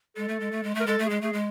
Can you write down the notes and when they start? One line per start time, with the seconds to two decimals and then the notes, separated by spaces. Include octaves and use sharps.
0.16 G#3 A4
0.28 A3
0.40 G#3
0.52 A3
0.63 G#3
0.75 A3
0.81 A#4
0.86 G#3 A4
0.99 A3
1.06 G#3 G#4
1.21 A3 G#4
1.33 G#3